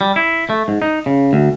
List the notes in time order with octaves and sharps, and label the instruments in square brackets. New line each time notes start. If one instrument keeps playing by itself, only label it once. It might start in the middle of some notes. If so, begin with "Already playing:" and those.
[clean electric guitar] G3
E4
A3
G#2
D#4
C#3
D2